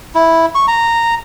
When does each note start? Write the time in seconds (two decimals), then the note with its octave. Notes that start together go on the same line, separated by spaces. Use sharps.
0.15 E4
0.55 C#6
0.68 A#5